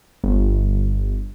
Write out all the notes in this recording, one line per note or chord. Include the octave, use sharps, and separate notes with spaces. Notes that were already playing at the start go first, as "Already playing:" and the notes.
G1